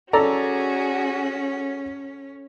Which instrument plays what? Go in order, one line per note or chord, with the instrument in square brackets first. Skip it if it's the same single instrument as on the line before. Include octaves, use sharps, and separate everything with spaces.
[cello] C#4 [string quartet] F#4 G#4 [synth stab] A4 [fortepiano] D5 A#5